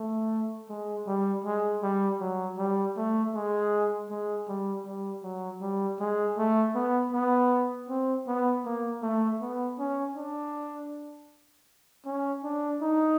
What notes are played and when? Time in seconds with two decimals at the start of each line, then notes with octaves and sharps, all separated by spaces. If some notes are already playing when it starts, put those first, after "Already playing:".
Already playing: A3
0.69 G#3
1.07 G3
1.44 G#3
1.83 G3
2.21 F#3
2.58 G3
2.97 A3
3.34 G#3
4.10 G#3
4.48 G3
4.86 G3
5.23 F#3
5.61 G3
6.00 G#3
6.38 A3
6.75 B3
7.13 B3
7.89 C4
8.27 B3
8.65 A#3
9.03 A3
9.41 B3
9.79 C#4
10.16 D4
12.06 C#4
12.44 D4
12.82 D#4